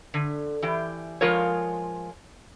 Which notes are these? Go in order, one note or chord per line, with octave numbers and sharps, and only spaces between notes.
D3
E3 G4
F3 G#3 F4 A#4 C#5